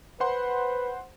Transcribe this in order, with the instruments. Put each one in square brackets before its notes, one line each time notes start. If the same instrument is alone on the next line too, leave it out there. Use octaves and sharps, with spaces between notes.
[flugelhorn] B4 [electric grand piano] C5 F#5 C6